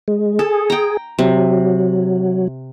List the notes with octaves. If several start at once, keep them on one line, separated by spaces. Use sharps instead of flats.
G#3
G#4 A4
G5 A#5
C3 F#3